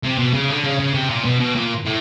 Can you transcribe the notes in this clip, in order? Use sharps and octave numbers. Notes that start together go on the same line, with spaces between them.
C3
B2
C#3
D3
C#3
C#3
C3
A#2
B2
B2
A#2
A2